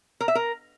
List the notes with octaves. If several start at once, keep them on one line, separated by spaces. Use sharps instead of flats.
A#4
E5
A#4